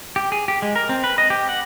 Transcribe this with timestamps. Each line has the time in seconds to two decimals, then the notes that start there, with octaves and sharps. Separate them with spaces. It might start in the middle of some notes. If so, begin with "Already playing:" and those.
0.16 G4
0.32 G#4
0.48 G4
0.62 G#3
0.76 A#4
0.89 C4
1.04 B4
1.18 D#5
1.30 G4
1.49 F#5